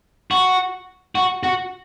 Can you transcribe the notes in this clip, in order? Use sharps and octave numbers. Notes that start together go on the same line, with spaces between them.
F#4
F#4
F#4